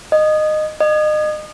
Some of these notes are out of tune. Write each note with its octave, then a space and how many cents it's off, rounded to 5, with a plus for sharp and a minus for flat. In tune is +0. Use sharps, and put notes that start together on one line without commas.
D#5 -15
D#5 -30